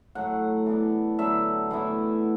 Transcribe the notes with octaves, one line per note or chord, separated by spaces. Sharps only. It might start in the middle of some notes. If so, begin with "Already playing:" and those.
A2 F#3 A3 F#5
E3 B3 D4
D3 F#3 B3 D4 E5
A2 E3 B3 E4